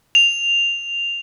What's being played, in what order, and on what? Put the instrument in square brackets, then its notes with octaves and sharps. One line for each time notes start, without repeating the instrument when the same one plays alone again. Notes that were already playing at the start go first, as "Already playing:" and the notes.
[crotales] F7